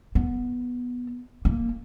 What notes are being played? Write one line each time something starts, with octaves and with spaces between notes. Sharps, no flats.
B3
A#3